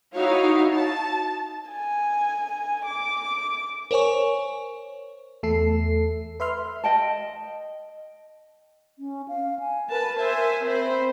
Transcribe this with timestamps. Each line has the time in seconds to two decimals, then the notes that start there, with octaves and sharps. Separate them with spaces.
0.14 D#4 E4 F#4 C#5 F5
0.73 A5
1.70 G#5
2.86 D6
3.91 A#4 C5 C#5 G#5 C#6
5.43 E2 A3 A4 C7
6.40 B4 E5 C6 F6
6.84 D#5 G5 A5
8.99 C#4
9.28 F5
9.59 G#5
9.90 A#4 B4 A5
10.19 C5 E5 G#5
10.64 C4 C5 B5